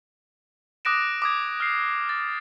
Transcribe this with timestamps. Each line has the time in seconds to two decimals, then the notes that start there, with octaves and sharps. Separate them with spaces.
0.85 D6 D#6 F#6 A#6 D7 E7
1.22 D6 D#6 G#6
1.60 F6 C7
2.09 A6